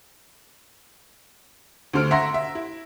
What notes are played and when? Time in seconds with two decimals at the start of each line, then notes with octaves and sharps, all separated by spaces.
1.93 D2 D3 C5 F6 D7
2.11 E5 F#5 A#5 C6 A#6
2.34 E5
2.55 E4